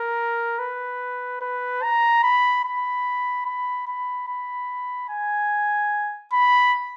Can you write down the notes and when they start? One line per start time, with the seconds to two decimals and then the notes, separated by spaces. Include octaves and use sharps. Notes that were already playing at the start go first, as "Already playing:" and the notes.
Already playing: A#4
0.59 B4
1.41 B4
1.82 A#5
2.23 B5
2.64 B5
3.45 B5
3.87 B5
4.28 B5
5.09 G#5
6.33 B5